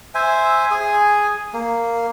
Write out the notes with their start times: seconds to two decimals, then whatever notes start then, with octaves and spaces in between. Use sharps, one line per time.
0.15 C5 E5 G#5
0.71 G#4 G#5
1.54 A#3